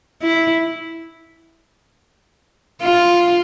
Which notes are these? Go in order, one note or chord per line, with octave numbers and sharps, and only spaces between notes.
E4
F4